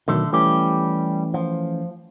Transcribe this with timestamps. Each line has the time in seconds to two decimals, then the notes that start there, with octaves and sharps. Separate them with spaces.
0.08 B2 D3 D#3 F#3 A3
0.33 E3 G3 A3 C#4 G4
1.34 F3